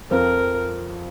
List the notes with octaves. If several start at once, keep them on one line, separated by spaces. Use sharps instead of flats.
F2 F3 C4 A#4